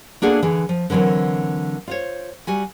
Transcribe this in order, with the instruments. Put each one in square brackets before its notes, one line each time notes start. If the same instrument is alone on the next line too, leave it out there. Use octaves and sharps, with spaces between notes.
[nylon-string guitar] A#3 B3 D4 F#4 G#4 A4
D3 E3 G#4
F3
D3 E3 F#3 C4 A#4
F4 C5 C#5
G3 F#4 G#5